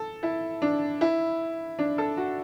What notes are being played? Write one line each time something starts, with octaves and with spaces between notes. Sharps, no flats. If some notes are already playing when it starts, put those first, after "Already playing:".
Already playing: A4
E4
D4
E4
D4
A4
F#4